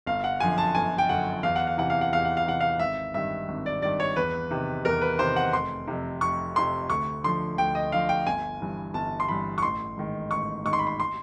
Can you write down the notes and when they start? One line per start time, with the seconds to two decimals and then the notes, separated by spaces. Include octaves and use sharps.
0.07 G1 F5
0.24 F#5
0.40 F#2 D3 F3 G#5
0.58 A5
0.75 G1 G#5
0.98 G5
1.09 F#2 D3 F3 F#5
1.43 E2 F5
1.56 F#5
1.67 F5
1.77 C3 E3 F#5
1.90 F5
2.01 F#5
2.12 E2 F5
2.25 F#5
2.37 F5
2.46 C3 E3 F#5
2.60 F5
2.79 G#1 E5
3.14 G2 D#3 E5
3.48 G#1
3.66 D5
3.82 G2 D#3 D5
4.00 C#5
4.16 E2 B4
4.51 C3 D#3
4.85 E2 A#4
5.01 B4
5.19 C3 D#3 C5
5.36 F#5
5.53 F1 C6
5.87 F2 C3
6.21 F1 C#6
6.55 F2 C3 C6
6.90 D2 C#6
7.24 D3 F3 C6
7.58 D2 G5
7.75 D#5
7.92 D3 F3 F5
8.09 G5
8.27 G1 G#5
8.60 G2 E3
8.94 G1 A5
9.20 C6
9.28 G2 E3 B5
9.58 C#6
9.63 A1 C6
9.97 G#2 D#3
10.31 A1 C#6
10.65 G#2 D#3 C#6
10.73 C6
10.79 B5
10.87 C6
11.00 C6